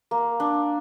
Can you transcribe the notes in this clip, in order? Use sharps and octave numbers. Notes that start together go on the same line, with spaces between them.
A#3
D4